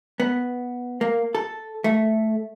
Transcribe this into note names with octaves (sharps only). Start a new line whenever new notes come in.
B3
A#3
A4
A3